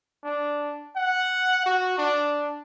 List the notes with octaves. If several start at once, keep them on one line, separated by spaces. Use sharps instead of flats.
D4
F#5
F#4
D4